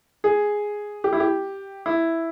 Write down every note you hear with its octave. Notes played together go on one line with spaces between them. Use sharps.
G#4
G4
E4
G4
E4